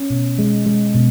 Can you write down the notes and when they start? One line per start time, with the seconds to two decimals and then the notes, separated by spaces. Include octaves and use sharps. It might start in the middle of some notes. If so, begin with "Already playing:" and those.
Already playing: C#4
0.10 B2
0.39 G#3
0.66 G#3
0.95 B2